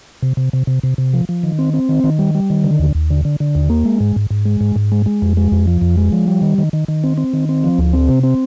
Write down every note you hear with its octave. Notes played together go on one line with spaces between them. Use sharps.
C3
C3
C3
C3
C3
C3
F3
F3
D#3
C4
C4
D#3
D#3
G3
G3
D#3
D3
D#2
D#2
D3
D3
D3
D#2
A#3
G#3
G#2
G#2
G#2
G#3
G#2
G#2
G#3
G#3
F2
G#3
F2
F3
F2
G#3
F3
G3
D#3
D#3
D#3
D#3
C4
C4
D#3
C4
F3
D2
C4
C3
C4